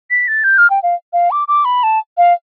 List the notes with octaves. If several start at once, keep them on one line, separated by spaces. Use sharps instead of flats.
B6
A6
G6
F6
G5
F5
F5
D6
D6
B5
A5
F5